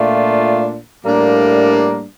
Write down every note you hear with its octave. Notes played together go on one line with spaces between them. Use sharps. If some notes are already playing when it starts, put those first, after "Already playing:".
Already playing: A#2 A3 D4 F4
A2 G3 A#3 D4